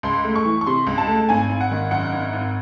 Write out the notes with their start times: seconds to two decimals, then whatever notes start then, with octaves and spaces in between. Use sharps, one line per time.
0.03 C#2 C6
0.24 A3
0.36 C#6
0.45 E3
0.61 C#6
0.66 C3 C6
0.87 C#2
0.98 A5
1.08 A3
1.29 G#1 G#5
1.49 G#1
1.61 F#5
1.71 D#3
1.91 F#2 F#5
2.13 G#1
2.33 G#1